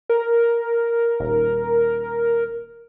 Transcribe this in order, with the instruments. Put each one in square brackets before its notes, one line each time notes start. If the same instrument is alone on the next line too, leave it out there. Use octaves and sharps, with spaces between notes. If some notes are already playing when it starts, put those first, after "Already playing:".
[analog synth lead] A#4
[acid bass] D#1